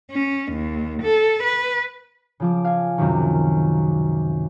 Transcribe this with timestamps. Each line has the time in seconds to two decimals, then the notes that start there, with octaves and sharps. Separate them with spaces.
0.12 C#4
0.52 D#2
1.03 A4
1.44 B4
2.40 C#3 F3 D6
2.64 F5 G#5
2.98 C#2 F#2 C3 D#3